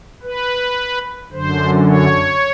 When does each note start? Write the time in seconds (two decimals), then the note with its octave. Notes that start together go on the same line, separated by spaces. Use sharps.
0.23 B4
1.32 F#2 D3 C5
1.86 C#5